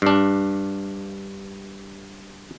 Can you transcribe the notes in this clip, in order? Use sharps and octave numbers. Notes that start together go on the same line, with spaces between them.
G2 D4